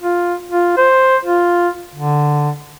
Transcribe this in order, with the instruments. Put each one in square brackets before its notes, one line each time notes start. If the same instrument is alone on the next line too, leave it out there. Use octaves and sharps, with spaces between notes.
[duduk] F4
F4
C5
F4
D3